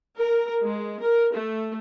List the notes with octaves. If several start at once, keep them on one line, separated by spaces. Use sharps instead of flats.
A#4
G#3
A#4
A3